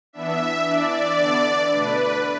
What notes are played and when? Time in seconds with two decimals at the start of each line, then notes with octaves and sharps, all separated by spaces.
0.13 E3 B3 D4 E5
0.65 E3 D4 D5
1.17 D3 B3 D4
1.69 B2 A3 D4 B4